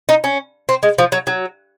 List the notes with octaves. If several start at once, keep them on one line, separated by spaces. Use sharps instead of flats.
D#4
C#4
C4
G#3
F3
F#3
F#3